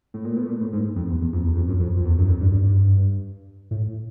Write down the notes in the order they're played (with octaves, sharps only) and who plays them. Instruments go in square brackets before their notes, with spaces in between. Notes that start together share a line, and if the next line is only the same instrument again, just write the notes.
[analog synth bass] A2
A#2
B2
A2
A#2
A2
G#2
F2
E2
E2
F2
E2
F2
F#2
F2
F2
E2
F#2
F2
G2
G2
G2
A2